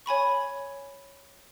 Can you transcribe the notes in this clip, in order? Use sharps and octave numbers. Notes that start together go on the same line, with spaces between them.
C#5 G#5 B5 C#6